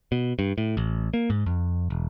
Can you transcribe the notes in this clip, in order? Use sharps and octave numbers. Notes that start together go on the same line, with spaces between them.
B2
G2
A2
A1
A#3
G#2
F2
E1